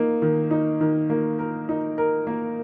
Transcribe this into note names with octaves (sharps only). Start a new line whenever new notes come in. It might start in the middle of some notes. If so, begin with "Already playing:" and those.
Already playing: A#3 D#4
D#3
D#4
D#3
A#3
A#4
D#4
A#4
A#3